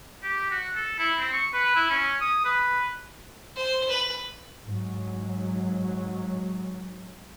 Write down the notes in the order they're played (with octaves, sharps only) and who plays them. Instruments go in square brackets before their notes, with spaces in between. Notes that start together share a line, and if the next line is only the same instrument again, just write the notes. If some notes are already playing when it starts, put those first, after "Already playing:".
[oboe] G4
F#4
A4
E4
C4
C#6
B4
E4
C#4
D#6
B4
[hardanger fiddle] C5
B4
[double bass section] G#2 F#3